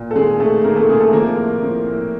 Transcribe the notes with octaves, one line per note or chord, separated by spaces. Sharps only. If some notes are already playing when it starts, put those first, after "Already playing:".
Already playing: A#2
A4
D#3 G#3 G#4
C3 A3 A4
D#3 A#3 A#4
A3 A4
C3 G#3 G#4
A3 A4
F3 A#3 A#4
A2
F3
A2